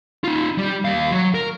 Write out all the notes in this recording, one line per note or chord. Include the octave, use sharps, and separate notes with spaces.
D#4 F4
G3
D#2 F5
F#3
A#4